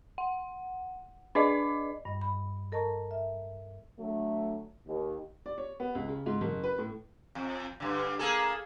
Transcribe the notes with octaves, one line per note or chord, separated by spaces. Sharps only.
F#5
D4 B4 D5 D#5 D6
G2 G3 D#5
B5
A4 A#4 D#5 A5 A#5 C#6
E5
D3 F#3 A3
D#2
D5
C#5
B3
C#2
C#3
G#2
F#1
B4
A2
F2
G2 D3
A#3 G#4 A4